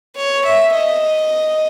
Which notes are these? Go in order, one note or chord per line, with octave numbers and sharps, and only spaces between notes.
C#5
E5
D#5